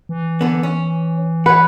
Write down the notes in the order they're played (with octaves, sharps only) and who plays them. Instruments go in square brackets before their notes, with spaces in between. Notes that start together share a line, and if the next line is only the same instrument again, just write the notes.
[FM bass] E3
[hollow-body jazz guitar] D3 B3
C#4
[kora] B4 [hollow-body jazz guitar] C#5 F#5